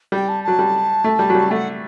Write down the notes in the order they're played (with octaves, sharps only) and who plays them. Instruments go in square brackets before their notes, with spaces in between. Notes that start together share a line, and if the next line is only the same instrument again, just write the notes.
[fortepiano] G3 [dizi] G5
[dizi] A5
[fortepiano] F#3 [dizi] A5
[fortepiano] G3
A3
G3
F#3
G3
[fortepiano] A3 [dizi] F#5